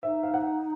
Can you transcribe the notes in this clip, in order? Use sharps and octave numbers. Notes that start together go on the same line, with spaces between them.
D#4 E5
F5
F#5